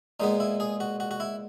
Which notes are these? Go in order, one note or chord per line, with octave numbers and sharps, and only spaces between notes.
A#2 G#3 B3 D#4
E4
G#4
F#4
F#4
F#4
E4